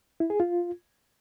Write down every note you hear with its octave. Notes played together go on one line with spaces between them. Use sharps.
E4
G#4
F4